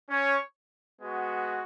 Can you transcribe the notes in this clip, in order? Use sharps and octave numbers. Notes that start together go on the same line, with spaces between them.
C#4 C#5
G#3 B3 F#4